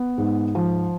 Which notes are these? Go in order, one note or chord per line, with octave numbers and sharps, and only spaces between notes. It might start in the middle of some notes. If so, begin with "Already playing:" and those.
Already playing: B3
G#2
F3